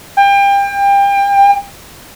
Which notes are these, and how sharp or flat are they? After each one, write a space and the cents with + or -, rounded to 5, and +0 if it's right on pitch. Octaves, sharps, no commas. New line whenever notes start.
G5 +30